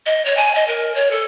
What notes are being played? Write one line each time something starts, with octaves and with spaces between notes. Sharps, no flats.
D#5
C#5
G#5
D#5
A#4
C#5
A4